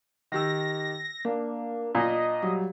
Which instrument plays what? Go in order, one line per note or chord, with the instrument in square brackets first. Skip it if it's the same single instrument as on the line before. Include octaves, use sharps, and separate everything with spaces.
[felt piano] D#3 G4 E6 [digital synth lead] A#6
[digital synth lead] A#3 [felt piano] D4
[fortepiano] A#2 [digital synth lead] D#5
[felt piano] F#3 G3